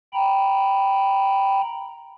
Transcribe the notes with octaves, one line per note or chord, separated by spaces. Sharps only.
G5 A#5 B5